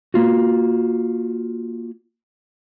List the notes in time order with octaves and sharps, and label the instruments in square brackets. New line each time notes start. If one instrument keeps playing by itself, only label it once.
[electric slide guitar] A#3 F4 F#4